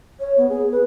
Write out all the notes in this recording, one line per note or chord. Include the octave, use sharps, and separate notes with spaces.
C#5
B3
G#4
B4